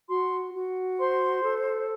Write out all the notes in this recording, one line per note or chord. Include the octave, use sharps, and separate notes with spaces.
F#4 C6
F#4
C5 C6
A4